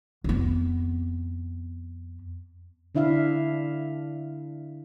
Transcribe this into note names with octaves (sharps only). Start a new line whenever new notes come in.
F2 B3
D3 D4 E4 E5 F5